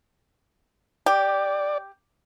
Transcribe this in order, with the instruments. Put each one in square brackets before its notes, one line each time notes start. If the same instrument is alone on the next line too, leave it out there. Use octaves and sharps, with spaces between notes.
[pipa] G4 [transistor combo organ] D5